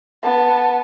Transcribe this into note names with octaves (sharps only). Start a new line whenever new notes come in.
B3 A5